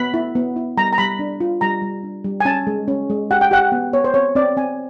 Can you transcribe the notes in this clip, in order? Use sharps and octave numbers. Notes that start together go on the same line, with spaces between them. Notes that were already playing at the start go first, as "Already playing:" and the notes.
Already playing: B3 B5
E4
B3
E4
G3 A#5
A#5
G3 B5
D4
F4
G3 A#5
G3
D4
G3
G#5
C#4 A5
G#3
C#4
G#3
G4 F#5
G5
G4 F#5
B3
B3 C#5
C5
C4 C#5
C4 D5
C4 G#5